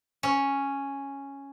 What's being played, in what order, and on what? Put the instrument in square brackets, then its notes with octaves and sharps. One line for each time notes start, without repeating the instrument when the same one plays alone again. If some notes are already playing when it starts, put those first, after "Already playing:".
[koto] C#4